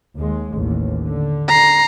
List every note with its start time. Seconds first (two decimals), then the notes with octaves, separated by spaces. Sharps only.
0.15 D#2 G#3
0.52 A1 D#2
1.05 D3
1.48 A#5 C7